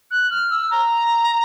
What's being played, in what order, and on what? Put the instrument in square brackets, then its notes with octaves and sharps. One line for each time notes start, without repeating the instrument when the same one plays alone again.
[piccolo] F#6
F6
E6
A#5